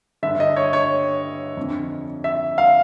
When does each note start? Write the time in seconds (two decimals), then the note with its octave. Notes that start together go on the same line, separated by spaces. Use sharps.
0.23 G2 D3 E5
0.40 D#5
0.56 C#5
0.73 C#5
1.57 F2 D3
2.24 E5
2.58 F5